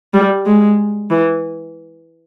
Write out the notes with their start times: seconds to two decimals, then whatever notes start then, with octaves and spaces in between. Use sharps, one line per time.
0.14 G3
0.46 G#3
1.10 E3